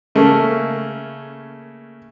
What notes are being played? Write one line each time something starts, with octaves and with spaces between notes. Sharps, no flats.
C#3 A3 A#3 C#4